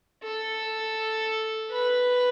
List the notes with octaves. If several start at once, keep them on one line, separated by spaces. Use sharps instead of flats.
A4
B4